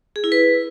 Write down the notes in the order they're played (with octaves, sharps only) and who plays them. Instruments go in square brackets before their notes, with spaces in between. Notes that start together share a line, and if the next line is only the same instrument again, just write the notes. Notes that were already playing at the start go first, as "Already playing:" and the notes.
[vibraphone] G#4
E4
B4